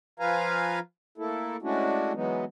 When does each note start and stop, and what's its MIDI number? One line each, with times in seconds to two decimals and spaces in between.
0.20 0.79 53
0.20 0.79 65
0.20 0.79 71
0.20 0.79 77
0.20 0.79 80
0.20 0.79 82
1.18 1.57 57
1.18 1.57 58
1.18 1.57 64
1.18 1.57 69
1.62 2.13 56
1.62 2.13 57
1.62 2.13 61
1.62 2.13 62
1.62 2.13 64
1.62 2.13 66
2.14 2.45 52
2.14 2.45 54
2.14 2.45 56
2.14 2.45 59
2.14 2.45 63